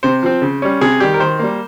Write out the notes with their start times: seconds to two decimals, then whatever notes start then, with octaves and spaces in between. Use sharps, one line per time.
0.03 C3 C5
0.23 F3 C4
0.42 C#3
0.62 G3 C#4
0.81 C3 G#4
1.00 D#3 G3 G4
1.14 A#4
1.20 D#3 C5
1.39 G3 A#3